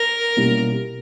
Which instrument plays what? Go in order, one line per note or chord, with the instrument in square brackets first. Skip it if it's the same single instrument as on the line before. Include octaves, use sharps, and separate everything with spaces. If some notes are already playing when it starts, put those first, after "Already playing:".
Already playing: [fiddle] A#4
[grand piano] B2 G3 A#3 C#4 E4